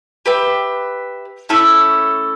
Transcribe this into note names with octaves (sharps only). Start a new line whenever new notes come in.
G4 B4 E5 G5
A3 C#4 E4 A4